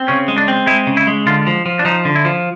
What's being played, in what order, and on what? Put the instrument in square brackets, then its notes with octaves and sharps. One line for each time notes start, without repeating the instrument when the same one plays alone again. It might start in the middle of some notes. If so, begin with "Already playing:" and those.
Already playing: [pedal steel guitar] C4
[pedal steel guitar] C#3 [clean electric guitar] C#4
[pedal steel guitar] G#3
[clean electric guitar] D4
[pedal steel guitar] C4
[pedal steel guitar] G#3 [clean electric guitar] E4
[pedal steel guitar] C#3
[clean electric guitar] E4
[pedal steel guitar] G#3
[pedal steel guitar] D3 [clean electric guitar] F4
[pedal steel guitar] F3
F3
[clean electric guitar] D4
[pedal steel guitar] F3 [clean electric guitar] D#4
[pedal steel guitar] D3
[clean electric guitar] E4
[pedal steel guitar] F3